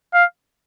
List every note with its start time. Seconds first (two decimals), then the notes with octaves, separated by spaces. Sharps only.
0.14 F5